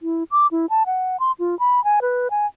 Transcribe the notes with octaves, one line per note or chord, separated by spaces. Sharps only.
E4
D6
E4
A5
F#5
C6
F4
B5
G#5
B4
G#5